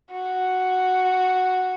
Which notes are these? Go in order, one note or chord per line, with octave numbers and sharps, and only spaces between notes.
F#4